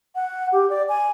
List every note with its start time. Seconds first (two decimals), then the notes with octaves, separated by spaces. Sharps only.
0.15 F#5
0.52 G4
0.70 D5
0.89 G#5